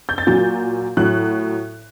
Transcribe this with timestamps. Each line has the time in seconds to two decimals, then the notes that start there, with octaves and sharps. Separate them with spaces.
0.09 G6
0.18 A6
0.27 A#2 F#3 G6
0.97 A2 F#3 F#6